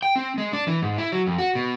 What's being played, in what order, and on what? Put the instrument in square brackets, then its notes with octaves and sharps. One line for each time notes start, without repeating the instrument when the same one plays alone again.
[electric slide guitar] G5
C4
G#3
D4
E3
G#2
E4
F#3
F2
F#4
B2